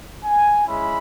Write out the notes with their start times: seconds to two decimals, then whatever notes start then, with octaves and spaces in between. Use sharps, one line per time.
0.25 G#5
0.67 G#3 C#4 E4 B5